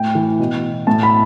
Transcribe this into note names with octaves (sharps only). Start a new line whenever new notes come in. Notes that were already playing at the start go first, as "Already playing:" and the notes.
Already playing: A2 G5
E3
B2
A2 A5
B5